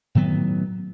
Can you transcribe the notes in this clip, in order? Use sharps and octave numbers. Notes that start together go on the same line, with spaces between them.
A2 D#3 F#3 B3